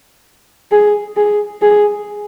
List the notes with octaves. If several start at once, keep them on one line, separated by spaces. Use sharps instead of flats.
G#4
G#4
G#4